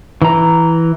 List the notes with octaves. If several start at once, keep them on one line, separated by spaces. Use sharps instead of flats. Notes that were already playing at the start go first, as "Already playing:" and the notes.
E3 A#5